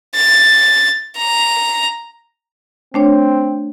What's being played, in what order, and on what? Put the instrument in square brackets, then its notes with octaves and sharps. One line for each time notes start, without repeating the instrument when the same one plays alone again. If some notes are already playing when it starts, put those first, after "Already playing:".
[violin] A6
A#5
[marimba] A3 D4 C#5 [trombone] C4